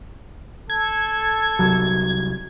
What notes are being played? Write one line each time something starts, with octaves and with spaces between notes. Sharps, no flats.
A4 G#6
C2 F#3